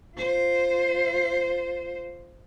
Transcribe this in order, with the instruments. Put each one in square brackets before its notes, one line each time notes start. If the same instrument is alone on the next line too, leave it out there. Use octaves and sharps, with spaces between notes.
[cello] F4 C5